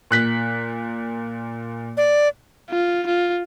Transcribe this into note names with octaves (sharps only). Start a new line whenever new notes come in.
A#2 F#6 B6
D5
F4
F4